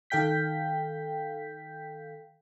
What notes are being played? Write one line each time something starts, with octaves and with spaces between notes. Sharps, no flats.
D#3 A4 F5 G5 G6 B6